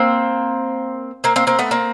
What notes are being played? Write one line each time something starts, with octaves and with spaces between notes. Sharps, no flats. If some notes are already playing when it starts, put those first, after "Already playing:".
Already playing: A#3 C4
A#3 C4
A#3 C4
A#3 C4
A3 B3
A#3 C4